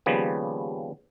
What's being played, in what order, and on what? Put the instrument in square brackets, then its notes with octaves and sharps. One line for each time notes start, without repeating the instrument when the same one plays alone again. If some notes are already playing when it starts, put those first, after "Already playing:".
[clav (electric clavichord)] D#2 C#3 F3 G3 B3